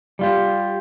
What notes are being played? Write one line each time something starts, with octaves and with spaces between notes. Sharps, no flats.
G3 F4 G4